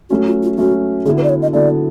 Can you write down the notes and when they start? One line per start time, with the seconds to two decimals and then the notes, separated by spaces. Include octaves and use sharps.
0.10 F#3 A3 C#4 F#4
0.27 F4
0.43 F4
0.58 F#3 A3 C#4 F#4
1.05 D3 F#3 B3 E4 G#4 A4
1.18 B4
1.23 D5
1.29 C#5
1.42 D#5
1.53 D3 F#3 B3 E4 A4 D5